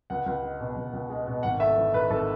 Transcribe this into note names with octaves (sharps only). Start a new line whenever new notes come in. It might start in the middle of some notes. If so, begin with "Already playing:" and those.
C#2 F#5
C#2
G#3
B2
C#2
C#2
G#3
B2
G#1 F#5
A3 E5
E3
G#2 B4
G#1 A4